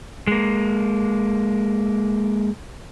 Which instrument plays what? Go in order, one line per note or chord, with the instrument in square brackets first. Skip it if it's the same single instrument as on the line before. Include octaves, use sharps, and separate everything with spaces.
[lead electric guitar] G#3 A#3